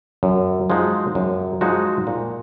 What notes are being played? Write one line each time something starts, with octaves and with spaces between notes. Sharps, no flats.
F#2
F3 G#3 D#4 F#4
F#2
F3 G#3 D#4 F#4
A#2